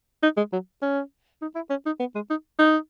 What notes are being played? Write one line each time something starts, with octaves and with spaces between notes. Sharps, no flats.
D#4
G#3
F#3
C#4
D#4
E4
C#4
D#4
B3
G#3
D#4
D#4